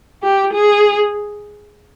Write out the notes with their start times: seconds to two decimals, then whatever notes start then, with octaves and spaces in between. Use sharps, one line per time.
0.23 G4
0.53 G#4